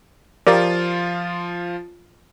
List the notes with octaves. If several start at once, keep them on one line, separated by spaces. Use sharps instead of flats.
F3 F4 G4 A#4 D5